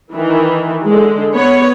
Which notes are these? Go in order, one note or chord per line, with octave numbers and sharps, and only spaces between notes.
D#3 E3
D3 G#3
B3 C#5